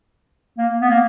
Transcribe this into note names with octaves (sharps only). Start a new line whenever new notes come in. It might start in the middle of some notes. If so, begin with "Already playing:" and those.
A#3
B3
A#3